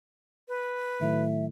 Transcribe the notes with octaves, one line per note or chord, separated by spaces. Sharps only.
B4
A2 D#3 F#3 E5